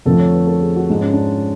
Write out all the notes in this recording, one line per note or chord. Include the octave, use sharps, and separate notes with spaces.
F2 D3 F3 A3 A4
C#5
B4
A4
G#4
F#4
G#2 F3 G#3 D4
C#4
D4